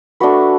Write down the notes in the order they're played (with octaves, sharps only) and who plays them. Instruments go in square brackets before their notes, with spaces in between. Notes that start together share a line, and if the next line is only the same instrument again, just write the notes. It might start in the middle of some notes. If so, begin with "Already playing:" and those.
[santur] A3 D4 F#4 B4